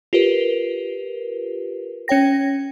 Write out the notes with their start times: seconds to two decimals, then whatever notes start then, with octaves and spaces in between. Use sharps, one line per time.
0.13 F4 G4 A#4 B4
2.08 C#4 C#5 G5 A#6